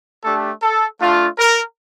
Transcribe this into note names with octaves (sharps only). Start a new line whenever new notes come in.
A3 D4 G4 A4
A4
A3 D4 F4
A#4